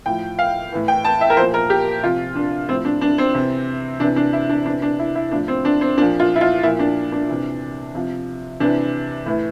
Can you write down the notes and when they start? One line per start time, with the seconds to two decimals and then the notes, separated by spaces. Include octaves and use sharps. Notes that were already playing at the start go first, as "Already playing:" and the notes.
0.06 A2 F3 G5
0.39 F5
0.72 A2 E3
0.88 G5
1.05 A5
1.21 E5
1.30 A#4
1.37 F3 C5
1.42 A#2
1.54 A#4
1.70 G4
2.03 C3 F3 F4
2.35 D4
2.68 A2 F3 C4
2.85 D4
3.01 D4
3.18 C4
3.34 C3 E3
4.00 C3 E3 D4
4.16 D4
4.33 E4
4.49 D4
4.66 C3 E3 D4
4.82 D4
4.99 E4
5.15 E4
5.31 A2 F3 D4
5.48 C4
5.65 D4
5.81 C4
5.98 A#2 D4
6.01 F3
6.20 F4
6.36 E4
6.41 F4
6.63 A#2 E4
6.66 F3
6.79 D4
7.12 D4
7.28 C3 E3
7.95 C3 F3
8.60 C3 E3 D4
9.26 A2 E3